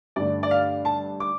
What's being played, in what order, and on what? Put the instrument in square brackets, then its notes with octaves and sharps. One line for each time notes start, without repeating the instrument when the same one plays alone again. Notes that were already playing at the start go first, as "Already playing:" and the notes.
[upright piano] G2 D3 A3 D5
D5
F5
A5
D6